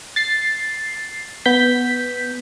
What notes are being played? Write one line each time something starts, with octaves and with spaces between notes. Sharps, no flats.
A6 C7
B3 G6 B6